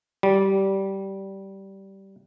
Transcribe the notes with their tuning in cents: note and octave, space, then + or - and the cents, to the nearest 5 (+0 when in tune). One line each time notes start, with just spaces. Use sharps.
G3 -15